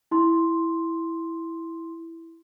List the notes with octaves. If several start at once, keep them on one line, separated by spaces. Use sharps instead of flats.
E4 C6